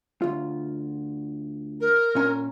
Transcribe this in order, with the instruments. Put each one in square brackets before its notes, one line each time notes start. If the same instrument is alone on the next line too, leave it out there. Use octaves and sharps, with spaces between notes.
[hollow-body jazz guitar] D2 F4
[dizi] A#4
[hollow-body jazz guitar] A#2 C#4 A#5